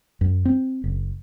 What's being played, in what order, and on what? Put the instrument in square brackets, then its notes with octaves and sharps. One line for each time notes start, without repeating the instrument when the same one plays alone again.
[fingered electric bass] F#2
C4
F#1